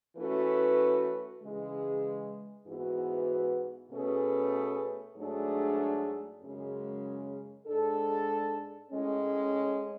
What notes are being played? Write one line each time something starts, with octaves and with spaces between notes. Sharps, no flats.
E3 A3 C#4 F#4 B4
C#3 E3 G#3
G#2 E3 B3 F#4 B4
B2 A3 C#4 G#4 B4
G#2 F#3 A3 D4 G#4
F#2 C#3 G#3
G#2 G#3 D4 A4
A2 G#3 C#4